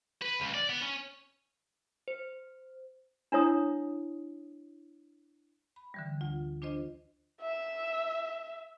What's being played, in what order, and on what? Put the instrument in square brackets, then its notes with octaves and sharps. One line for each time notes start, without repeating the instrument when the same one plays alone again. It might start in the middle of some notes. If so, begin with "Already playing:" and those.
[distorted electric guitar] B4
C#2
D5
B3
C#4
[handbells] C5
[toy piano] D4 E4 C#5 D#6
[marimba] B5
D3 E3 G3
D2 F4
D4 F4 C5 D#5
[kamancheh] E5